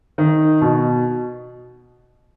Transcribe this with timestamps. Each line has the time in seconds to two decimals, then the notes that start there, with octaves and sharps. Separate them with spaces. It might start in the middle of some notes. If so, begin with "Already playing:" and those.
0.18 D#3
0.62 B2